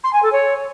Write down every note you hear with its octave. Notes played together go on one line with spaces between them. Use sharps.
C6
G#5
A4
C#5